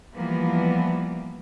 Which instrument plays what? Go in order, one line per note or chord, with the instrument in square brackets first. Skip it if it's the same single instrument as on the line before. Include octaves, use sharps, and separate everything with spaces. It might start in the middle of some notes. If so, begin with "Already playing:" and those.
[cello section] E3 F3 G3 A#3 B3